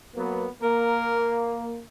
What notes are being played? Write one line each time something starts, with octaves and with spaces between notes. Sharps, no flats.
F#3 A#3 B3
A#3 A#4